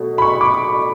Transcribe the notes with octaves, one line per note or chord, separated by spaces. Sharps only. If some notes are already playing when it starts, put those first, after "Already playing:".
Already playing: B2 F#3 A3
B5
C#6
D6